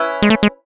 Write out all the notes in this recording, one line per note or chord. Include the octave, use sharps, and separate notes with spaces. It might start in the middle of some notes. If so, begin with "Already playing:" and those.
Already playing: C#4 E4 B4
G#3
A3
G#3